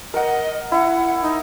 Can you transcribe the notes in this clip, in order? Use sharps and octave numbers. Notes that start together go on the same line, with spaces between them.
A#4 D#5 F#5
E4 F#5
D#4